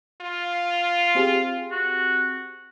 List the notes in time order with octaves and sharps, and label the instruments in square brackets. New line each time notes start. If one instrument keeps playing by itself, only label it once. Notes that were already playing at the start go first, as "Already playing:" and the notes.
[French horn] F4
[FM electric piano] C4 G4 G#4
[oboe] F#4